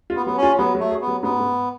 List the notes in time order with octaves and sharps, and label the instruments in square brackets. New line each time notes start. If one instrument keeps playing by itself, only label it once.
[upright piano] F4
[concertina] B3
[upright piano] F#3 [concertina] B3
[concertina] C#4
[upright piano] F4
[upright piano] F#3 [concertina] B3
[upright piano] F#3 [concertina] A3
[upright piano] G#4
[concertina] B3
[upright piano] F#3
[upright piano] G#2 [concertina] B3
[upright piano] G#2